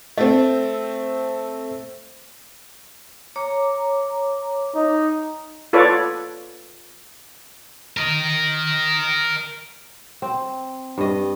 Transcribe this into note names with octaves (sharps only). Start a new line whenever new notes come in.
A3 C4
C#5 A#5 D6
D#4
F4 A4 B4 C#5 D5
A#4 D#5
C4
G2 D#5